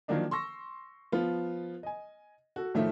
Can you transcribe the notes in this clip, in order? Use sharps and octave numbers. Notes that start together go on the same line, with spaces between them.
D#3 F3 F#3 A#3 D4 D#4
C6 C#6 E6 A#6
F3 B3 F4
D#5 G#5
F#4 A4
A1 D#3 F3 A3 E5